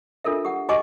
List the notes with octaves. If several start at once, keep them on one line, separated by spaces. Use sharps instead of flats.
D4 F4 A4 A#4 E5
G4 F#5
F#4 G4 D#5 G#5 C#6 D6